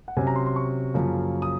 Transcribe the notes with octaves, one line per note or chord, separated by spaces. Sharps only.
F#5
C3 F#3 C#4 G#5
A#5
C6
C6
C#6
F#2 C#3 F3 A#3
D#6